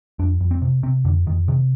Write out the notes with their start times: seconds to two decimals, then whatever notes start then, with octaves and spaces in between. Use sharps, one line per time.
0.19 F2 D4
0.40 F2
0.51 C4
0.62 C3
0.83 C3 C4
1.05 F2 D3
1.27 F2 D#3
1.48 C3 D#3